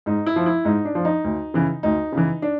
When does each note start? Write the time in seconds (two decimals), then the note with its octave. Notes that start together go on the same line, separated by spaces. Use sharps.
0.06 G#2 D#4
0.26 E4
0.36 F3
0.46 E4
0.65 G#2 D#4
0.85 D4
0.95 F3
1.05 D#4
1.24 D2
1.54 C#3 E3
1.83 D2 D#4
2.12 C#3
2.17 E3
2.42 D4